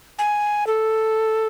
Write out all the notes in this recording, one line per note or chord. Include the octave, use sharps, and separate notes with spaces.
G#5
A4